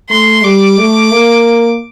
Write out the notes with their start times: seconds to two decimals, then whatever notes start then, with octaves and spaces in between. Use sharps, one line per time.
0.10 A3 C6
0.43 G3 D6
0.78 A3
1.11 A#3